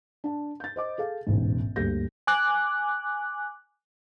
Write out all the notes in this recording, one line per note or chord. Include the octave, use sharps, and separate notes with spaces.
D4 A5
G6 A6
C5 D#5 D6
G#4 A4 F5
E1 A1 G#2
D2 G2 A#3 G4 G6 A#6
G#5 D6 F#6